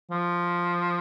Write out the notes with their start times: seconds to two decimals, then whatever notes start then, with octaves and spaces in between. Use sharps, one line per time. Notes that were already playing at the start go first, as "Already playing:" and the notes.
0.11 F3